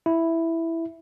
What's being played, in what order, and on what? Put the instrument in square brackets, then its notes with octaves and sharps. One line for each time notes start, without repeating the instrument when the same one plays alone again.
[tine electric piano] E4